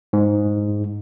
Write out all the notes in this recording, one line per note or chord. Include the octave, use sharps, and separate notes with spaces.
G#2